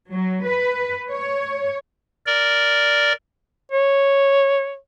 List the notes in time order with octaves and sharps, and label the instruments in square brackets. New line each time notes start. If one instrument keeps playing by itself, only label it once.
[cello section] F#3
B4
C#5
[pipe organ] A#4 D5
[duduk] C#5